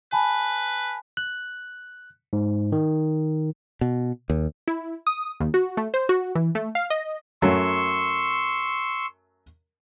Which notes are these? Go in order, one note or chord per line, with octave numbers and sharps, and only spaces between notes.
B4 G#5 A5 B5
F#6
G#2
D#3
B2
D#2
E4
D#6
D#2
F#4
A3
C5
F#4
E3
A3
F5
D#5
F#2 F#3 A3 C6 C#6 E6